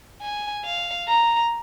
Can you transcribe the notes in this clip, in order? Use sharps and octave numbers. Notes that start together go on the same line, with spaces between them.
G#5
F5
A#5